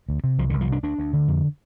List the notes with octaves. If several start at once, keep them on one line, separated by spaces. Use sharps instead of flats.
D2
C3
C2 F3
D3
C2
F3
C3 D4
D2 D4
D2
D3
F2